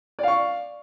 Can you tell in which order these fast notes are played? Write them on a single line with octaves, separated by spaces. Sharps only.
D5 F5 C#6